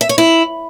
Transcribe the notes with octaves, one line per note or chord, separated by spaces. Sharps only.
E5
C#5
E4